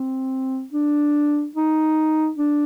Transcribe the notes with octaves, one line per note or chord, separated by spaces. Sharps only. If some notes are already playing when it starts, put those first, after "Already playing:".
Already playing: C4
D4
D#4
D4